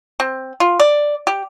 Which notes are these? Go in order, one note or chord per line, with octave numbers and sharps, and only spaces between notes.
C4
F4
D5
G4